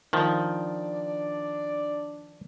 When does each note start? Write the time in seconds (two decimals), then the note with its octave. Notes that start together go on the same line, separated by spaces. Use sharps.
0.13 D#3 F3 D4 D5